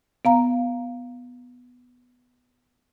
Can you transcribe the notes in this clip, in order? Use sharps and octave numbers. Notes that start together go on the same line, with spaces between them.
B3 F5 A#5